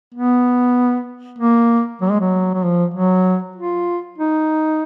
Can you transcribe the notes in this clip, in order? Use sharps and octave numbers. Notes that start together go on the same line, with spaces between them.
B3
A#3
F#3
G#3
F#3
F#3
F3
F#3
F4
D#4